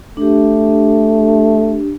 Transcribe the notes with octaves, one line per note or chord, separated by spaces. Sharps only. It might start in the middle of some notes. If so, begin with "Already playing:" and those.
A3 D4 G4